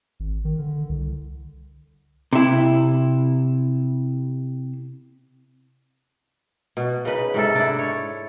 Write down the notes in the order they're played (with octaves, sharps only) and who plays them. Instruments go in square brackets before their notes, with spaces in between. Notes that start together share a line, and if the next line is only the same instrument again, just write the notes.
[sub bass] G#1
D#3
D3
C2
[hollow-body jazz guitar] C3 E4
[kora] B2
C#3 D#4 B4
G#2 C3 A4
D4 E4
C#5